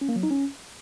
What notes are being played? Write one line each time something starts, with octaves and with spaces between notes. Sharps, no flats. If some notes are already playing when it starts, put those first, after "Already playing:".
C#4
A#3
F#3
D#4
C#4